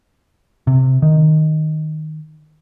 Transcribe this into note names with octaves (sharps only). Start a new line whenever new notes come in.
C3
D#3